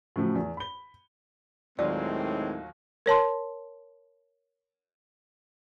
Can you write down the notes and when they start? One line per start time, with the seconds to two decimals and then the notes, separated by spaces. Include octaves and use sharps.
0.16 A2 C#3 F3 F#3 A3
0.35 E2
0.57 B5 G7
1.79 D#2 A2 D#3 F#3 G#3 C4 F4 D5
3.06 A#4 C#5 A5 C6